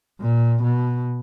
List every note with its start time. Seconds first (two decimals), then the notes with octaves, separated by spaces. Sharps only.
0.20 A#2
0.63 B2